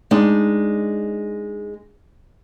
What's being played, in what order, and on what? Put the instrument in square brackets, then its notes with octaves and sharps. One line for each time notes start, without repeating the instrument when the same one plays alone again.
[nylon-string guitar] G#3 D4 D#4